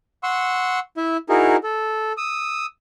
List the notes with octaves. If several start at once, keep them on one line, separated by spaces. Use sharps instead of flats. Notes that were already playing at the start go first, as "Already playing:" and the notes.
F#5 C6 C#6 E6
E4 E5
D#4 E4 F#4 G#4 A#4
A4
D#6 E6